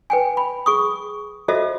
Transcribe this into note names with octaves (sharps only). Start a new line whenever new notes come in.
B4 G5 G#5
B5
G#4 C#6 D#6
F4 F#4 A4 C5 D#5 E5